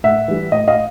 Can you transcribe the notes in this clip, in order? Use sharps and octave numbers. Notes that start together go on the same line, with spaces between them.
A2 E5 F#5
E3 G3
A2 D#5
D#5 F5